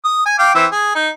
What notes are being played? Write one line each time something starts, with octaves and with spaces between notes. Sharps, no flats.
D#6
G#5
F5 G5 D6
E3 C4 E5
G#4
D#4